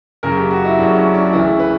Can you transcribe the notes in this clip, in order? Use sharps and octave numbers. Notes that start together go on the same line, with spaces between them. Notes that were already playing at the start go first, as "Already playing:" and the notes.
F#1 F#2 C#3 A#4
G4
F#4
E4
F#1 F#2 C#3 D4
C#4
D4
D2 C#3 E3 E4
B4